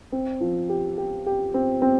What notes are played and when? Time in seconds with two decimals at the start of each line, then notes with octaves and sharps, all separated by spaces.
0.12 C4
0.41 F3
0.69 G4
0.98 G4
1.26 G4
1.54 C4
1.82 C4